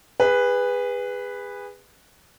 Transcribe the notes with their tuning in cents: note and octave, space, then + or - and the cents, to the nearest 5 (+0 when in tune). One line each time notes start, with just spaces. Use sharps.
G#4 -30 B4 +0